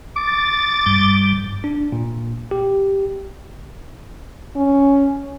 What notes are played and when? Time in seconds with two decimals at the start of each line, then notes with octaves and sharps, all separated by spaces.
0.17 D6 A6
0.86 G2 G3
1.64 D4
1.92 A#2
2.51 G4
4.56 C#4